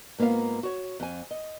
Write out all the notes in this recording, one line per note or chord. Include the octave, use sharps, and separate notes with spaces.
G#2 A#3 B3 F4 F5
F#4 C#5
F2 G#5
D#5